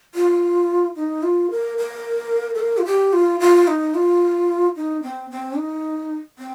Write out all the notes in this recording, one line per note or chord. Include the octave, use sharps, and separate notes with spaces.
F4
D#4
F4
A#4
A#4
A4
A#4
F4
G4
F4
F4
D#4
F4
D#4
C4
C4
D#4
C4